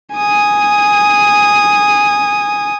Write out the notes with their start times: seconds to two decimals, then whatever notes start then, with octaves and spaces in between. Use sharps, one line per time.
0.15 G#5 D#6